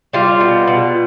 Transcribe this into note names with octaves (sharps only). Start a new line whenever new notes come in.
G3 F4
B2
B2